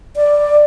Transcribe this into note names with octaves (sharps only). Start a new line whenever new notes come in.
D5